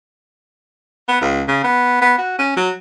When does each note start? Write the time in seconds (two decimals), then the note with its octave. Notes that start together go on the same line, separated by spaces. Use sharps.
1.08 B3
1.21 C#2
1.48 C#3
1.64 B3
2.01 B3
2.18 F#4
2.39 C#4
2.56 F#3